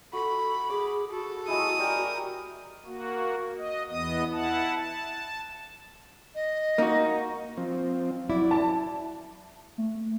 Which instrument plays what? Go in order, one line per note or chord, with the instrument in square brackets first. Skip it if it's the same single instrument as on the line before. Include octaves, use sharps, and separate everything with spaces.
[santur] F#4 [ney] A4 [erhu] B5
[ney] G#4 [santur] D6
[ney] F#4 [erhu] A4
[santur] F#3 G#3 E4 [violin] D#6
[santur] G4 D5 G#5 [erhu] A#4
[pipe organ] A#3 F#4
D#5
E2 B3 D#5 D#6
E4 F#5 A5
A5
[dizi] D#5
[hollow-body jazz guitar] A#3 F#4 [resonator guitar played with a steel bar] D#4
[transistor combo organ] F3 C4
[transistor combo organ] F#3 D5 [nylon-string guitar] E4
[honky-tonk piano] A5
[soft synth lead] A3